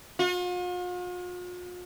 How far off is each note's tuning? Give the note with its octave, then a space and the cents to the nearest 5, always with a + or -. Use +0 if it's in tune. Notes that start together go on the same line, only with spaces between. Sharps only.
F4 +45